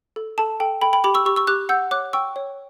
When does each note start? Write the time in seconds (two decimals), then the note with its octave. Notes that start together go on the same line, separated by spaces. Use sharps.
0.16 A4
0.38 A4 A5
0.60 A4 G5
0.81 A4 G5 B5
0.93 G5 B5
1.04 G4 B5 D6
1.14 C#6 E6
1.26 G4 C#6 E6
1.36 C#6 E6
1.47 G4 D6 F#6
1.69 F#5 E6 G6
1.91 C#5 D6 F#6
2.13 G5 C#6 E6
2.36 C#5